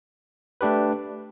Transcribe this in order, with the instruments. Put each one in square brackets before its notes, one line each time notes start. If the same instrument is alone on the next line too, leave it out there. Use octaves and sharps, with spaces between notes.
[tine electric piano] A3 D4 G4 B4